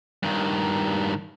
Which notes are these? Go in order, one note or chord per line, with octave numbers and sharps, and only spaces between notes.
G2 D#3